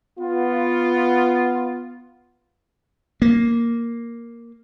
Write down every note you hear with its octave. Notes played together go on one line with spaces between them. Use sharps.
B3 F4
A#3